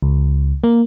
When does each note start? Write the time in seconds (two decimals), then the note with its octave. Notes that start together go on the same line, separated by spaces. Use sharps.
0.02 C#2
0.64 A#3